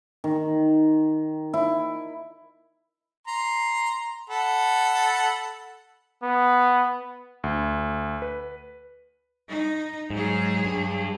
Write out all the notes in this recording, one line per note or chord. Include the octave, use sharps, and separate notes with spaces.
D#3
E4
A#5 C6
A4 F#5 B5
B3
D2
B4
D#4
G#2 F#3 G#4
G2